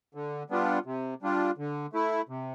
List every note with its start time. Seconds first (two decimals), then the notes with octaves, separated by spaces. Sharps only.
0.15 D3
0.50 G3 B3 D4 F4
0.86 C3
1.22 G3 D4 F4
1.58 D3
1.93 A3 E4
2.29 C3